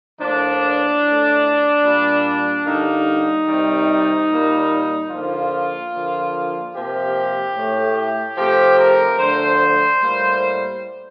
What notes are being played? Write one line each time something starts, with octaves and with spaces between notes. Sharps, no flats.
A2 F3 A#3 D4
A2 A3
A#2 G3 A#3
D3 G3 A#3 D#4
C3 D#3 G3
A#2 G3 A#3
D3 F3 A#3 F4
D3 F3 A#3
C3 F3 A#3 G4
A2 A3
C3 F3 A3 G4
A#4
D3 F3 A3 C5
A2 G3 A#3